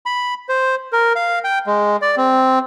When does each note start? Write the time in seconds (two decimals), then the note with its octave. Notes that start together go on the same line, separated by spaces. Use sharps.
0.06 B5
0.49 C5
0.93 A#4
1.16 F5
1.44 G5
1.67 G#3
2.02 D5
2.17 C4